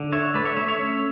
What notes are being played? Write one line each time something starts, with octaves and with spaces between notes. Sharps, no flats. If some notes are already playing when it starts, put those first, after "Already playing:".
Already playing: D3
D4 C#5 E5
A3 B4 D5
C#5 E5
A3 C#5 E5
C#5 E5
C#4